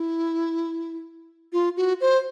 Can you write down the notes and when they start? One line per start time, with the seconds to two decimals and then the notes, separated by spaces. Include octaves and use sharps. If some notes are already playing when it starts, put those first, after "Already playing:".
Already playing: E4
1.53 F4
1.77 F#4
2.01 C5